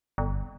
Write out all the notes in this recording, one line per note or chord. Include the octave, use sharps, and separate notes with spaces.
G1